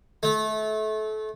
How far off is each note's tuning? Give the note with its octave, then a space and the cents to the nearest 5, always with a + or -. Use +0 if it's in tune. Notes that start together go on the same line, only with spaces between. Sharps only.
A3 -30